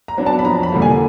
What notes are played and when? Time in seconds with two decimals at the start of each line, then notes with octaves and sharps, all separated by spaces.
0.08 A#5
0.17 F#3 B3 D4
0.26 A5
0.39 B5
0.45 F2 A#5
0.63 B5
0.72 D3 G3 A#3
0.82 G#5